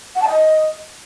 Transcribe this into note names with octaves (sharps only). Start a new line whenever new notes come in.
F#5
A5
D#5